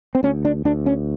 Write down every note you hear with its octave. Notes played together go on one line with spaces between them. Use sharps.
C4
D2 C#4
D4
D2 D4
C#4